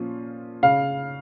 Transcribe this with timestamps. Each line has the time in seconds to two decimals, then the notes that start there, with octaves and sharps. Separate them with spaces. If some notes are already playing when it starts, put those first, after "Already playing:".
Already playing: A#2 F3 C#4 F4
0.63 C#3 F5